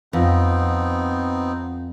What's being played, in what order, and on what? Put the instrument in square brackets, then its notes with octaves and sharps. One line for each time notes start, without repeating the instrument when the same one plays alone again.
[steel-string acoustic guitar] F2 [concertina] B3 C4 D#4